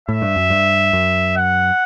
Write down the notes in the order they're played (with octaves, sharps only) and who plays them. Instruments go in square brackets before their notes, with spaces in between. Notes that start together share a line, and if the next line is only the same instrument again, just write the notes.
[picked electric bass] A2 [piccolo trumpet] E5
[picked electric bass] G2
F#2
G2
F#2
[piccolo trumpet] F#5